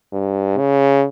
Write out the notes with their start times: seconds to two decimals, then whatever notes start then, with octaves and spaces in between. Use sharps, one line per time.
0.13 G2
0.58 C#3